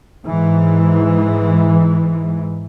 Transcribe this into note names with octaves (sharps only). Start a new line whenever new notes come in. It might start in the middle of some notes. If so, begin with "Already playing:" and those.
G#2 E3